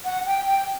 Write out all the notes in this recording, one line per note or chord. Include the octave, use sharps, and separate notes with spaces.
F#5
G5
G5